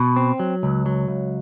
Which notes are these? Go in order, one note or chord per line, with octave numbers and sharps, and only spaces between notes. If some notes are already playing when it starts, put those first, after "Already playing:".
Already playing: B2
C4
F#3
C#2
F#3
C#2